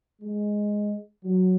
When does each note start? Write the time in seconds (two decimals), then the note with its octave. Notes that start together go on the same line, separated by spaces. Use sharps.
0.22 G#3
1.25 F#3